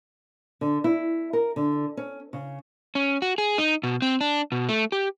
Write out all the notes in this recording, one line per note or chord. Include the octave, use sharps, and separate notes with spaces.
D3
E4
A#4
D3
C#4
C#3
C#4
F#4
G#4
D#4
B2
C4
D4
B2
A3
G4